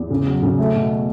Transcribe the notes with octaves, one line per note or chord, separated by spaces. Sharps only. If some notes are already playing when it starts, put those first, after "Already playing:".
Already playing: E2
C#3
F#3
C#3
A3
B2